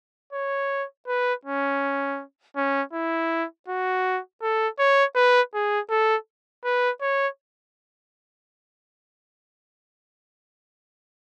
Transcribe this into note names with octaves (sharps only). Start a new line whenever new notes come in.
C#5
B4
C#4
C#4
E4
F#4
A4
C#5
B4
G#4
A4
B4
C#5